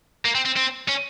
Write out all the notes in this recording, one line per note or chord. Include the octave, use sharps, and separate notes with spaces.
A#3
C4
C4
C4
C#4